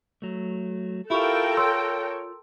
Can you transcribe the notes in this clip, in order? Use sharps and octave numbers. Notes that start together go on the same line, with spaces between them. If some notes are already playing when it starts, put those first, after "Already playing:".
F#3 A3
E4 F4 G4 A4 A#4 F5 G5 C#6
C#5 C6 E6